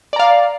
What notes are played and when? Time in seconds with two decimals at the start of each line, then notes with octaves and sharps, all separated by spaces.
0.13 D5
0.16 A#5
0.19 F5